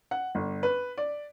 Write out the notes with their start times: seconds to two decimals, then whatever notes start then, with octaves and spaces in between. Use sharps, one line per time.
0.11 F#5
0.35 G1
0.63 B4
0.97 D5